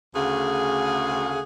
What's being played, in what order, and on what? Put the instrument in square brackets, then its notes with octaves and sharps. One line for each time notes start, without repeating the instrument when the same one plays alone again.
[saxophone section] D2 C#3 A3 G#4 F5 F#5